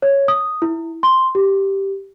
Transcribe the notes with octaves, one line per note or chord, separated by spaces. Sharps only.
C#5
D#6
E4
C6
G4